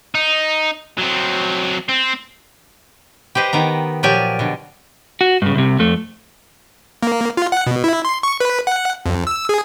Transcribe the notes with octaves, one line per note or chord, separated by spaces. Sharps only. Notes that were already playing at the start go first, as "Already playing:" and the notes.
D#4
F#3 C4
C4
G4 B4 C5 D#5
D#3 B3 A#5
A#2 F3 F#3 G4 D5 G#5
B2 D3
F#4
G2 C#3
C2 C3
F2 A3
A#3
F4
F#5
B2
E4
C6
C#6
B4
F#5
F2
E6
G#4